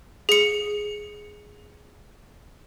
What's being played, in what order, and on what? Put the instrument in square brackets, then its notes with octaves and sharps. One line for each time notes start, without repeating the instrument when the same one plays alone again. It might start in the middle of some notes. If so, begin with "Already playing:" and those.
[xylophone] G#4 C#7